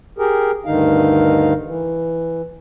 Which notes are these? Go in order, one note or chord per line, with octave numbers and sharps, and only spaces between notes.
G4 G#4 A#4
D2 G2 D3 D#3 D#4 F5
E3